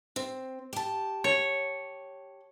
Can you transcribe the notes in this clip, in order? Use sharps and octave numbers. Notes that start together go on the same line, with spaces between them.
C4
G4 A5
C#5